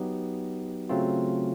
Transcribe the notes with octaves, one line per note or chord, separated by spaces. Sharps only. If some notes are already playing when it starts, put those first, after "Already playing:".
Already playing: F#3 B3 D#4 G4
C#3 F#3 A3 C4 F4